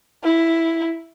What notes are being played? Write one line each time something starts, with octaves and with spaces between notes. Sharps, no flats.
E4